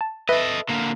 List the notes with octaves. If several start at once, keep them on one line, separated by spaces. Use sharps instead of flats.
A5
A4 B4 D#5 E5
D3 A#3